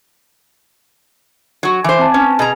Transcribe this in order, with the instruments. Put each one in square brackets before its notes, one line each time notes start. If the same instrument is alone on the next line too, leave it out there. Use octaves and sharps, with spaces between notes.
[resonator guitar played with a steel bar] F#3 F#4
[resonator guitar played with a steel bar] E3 C5 [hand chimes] G#5 D6
[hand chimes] C4 A5
[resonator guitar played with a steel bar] C#4 [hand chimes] B4 G#5
[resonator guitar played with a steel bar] B2 G#4 A#5